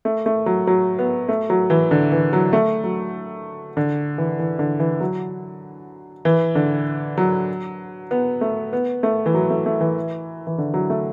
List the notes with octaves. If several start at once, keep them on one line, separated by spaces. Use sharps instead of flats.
A3
A3
F#3
F#3
B3
A3
F#3
E3
D3
E3
F#3
A3
F#3
D3
E3
E3
D3
E3
F#3
E3
D3
F#3
B3
A3
B3
A3
E3
F#3
A3
A3
E3
E3
D3
F#3
A3